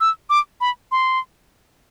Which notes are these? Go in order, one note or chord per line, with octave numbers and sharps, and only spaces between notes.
E6
D6
B5
C6